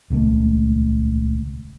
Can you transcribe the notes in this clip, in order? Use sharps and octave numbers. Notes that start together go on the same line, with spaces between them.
D#1 C#2 A3 A#3